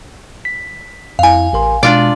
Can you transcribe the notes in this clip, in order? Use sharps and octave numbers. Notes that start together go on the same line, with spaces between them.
B6
F2 E4 F5 G#5
A1 A#4 C6
B2 G#3 D4 F4 D5